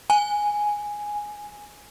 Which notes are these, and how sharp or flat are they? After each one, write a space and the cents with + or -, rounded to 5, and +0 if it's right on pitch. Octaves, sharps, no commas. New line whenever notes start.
G#5 +0